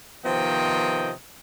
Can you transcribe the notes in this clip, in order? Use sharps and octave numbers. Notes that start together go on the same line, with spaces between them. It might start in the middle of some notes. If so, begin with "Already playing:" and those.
C3 D#3 F3 B3 D#5 G5